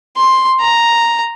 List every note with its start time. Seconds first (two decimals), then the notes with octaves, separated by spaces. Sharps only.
0.17 C6
0.61 A#5